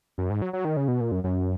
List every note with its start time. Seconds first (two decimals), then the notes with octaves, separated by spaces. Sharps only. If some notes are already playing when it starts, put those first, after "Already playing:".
0.18 F#2
0.30 G#2
0.42 F#3
0.53 F#3
0.65 D#3
0.77 C#3
0.88 B2
1.01 A#2
1.12 F#2
1.24 F#2